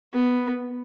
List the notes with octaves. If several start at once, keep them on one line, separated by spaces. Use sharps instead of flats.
B3